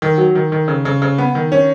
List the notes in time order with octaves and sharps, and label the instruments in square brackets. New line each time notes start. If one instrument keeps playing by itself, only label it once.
[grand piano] D#3
F#3
D#3
D#3
C#3
C#3
C#3
B3
D#3
C#4